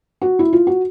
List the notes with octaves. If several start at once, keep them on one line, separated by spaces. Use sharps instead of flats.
F#4
E4
F4
F#4